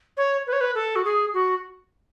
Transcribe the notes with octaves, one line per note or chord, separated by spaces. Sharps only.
C#5
B4
C#5
B4
A4
F#4
G#4
F#4